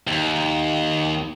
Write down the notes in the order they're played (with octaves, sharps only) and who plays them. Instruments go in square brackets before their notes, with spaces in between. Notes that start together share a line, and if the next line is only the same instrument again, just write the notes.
[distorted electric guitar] D#2